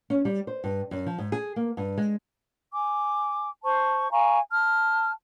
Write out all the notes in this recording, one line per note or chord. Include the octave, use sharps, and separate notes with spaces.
C#4
G3
C5
G2
F#2
F3
G#2
G#4
A#3
G2
G#3
G#5 D6
C5 A5 C#6
F5 G#5 A#5 C#6
A5 F6